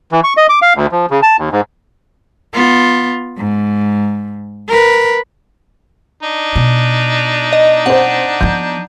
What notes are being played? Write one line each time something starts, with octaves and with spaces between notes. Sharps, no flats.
E3
C#6
D#5
D6
F5
D2
F3
C#3
A5
D#2
G#2
B3 F4
G#2
A#4 B4
D4 D#4
B2
D#5
C4 C5 F#5
F3 B3 G6